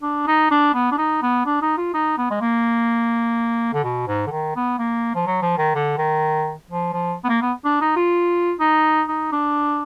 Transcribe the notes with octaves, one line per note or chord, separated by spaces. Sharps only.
D4
D#4
D4
B3
D4
D#4
B3
D4
D#4
F4
D#4
B3
G#3
A#3
D3
B2
G#2
D3
D#3
B3
A#3
F3
F#3
F3
D#3
D3
D#3
F3
F3
B3
A#3
B3
D4
D#4
F4
D#4
D#4
D4